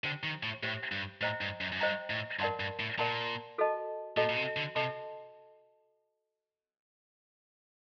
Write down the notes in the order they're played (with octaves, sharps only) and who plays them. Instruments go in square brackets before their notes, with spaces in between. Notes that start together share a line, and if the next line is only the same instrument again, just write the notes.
[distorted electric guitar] D3 [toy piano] G4 C5 G5
[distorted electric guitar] D#3
A2
[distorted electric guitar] A2 [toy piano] G4 C5 G5
[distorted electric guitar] G2
[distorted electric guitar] A2 [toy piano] C5 D#5 G5 A#5
[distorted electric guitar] G2
F#2
F#2
[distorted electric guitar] G2 [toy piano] C5 D#5 G5 A#5
[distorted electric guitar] A2
[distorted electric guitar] G2 [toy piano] A#4 D5 F#5 A5 C6
[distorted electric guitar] G2
A2
[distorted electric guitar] A#2 [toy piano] A#4 D5 F#5 A5 C6
[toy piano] F#4 A4 D#5 A5
[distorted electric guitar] A#2 [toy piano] F#4 A4 D#5 A5
[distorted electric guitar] A#2
C3
D3
[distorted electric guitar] C3 [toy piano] A4 D#5 A5 C6